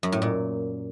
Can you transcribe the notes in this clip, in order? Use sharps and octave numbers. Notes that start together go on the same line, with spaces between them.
F#2
A2
A#2